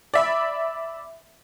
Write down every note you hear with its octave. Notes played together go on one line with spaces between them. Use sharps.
D5 E5 B5